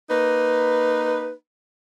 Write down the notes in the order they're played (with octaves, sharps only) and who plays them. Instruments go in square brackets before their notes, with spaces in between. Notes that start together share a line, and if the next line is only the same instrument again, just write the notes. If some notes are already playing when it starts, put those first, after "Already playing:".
[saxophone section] A#3 D#4 B4